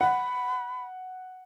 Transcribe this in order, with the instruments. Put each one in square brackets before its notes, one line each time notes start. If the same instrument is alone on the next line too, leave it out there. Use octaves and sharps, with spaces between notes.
[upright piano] F#5 [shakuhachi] B5